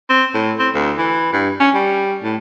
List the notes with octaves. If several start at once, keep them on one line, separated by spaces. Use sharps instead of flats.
C4
A2
C4
D2
E3
G2
C#4
G3
A2